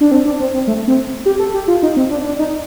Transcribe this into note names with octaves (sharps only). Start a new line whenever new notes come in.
D4
C4
D4
C4
C4
A3
C4
G4
A4
G4
F4
D#4
C4
D4
D4
D#4